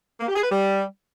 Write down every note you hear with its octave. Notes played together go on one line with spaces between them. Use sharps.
A#3
G4
G#4
B4
G3